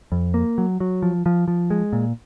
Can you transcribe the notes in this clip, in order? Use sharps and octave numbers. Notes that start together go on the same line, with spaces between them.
F2
A#3
F#3
F#3
F3
F3
F3
G#3
A#2